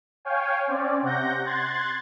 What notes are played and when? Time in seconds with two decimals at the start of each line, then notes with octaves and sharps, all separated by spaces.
0.25 C#5 F5 G5 G#5
0.67 C4 C#4 D5
1.02 C3 F#5 G6 A#6
1.45 C6 F#6 G#6 A6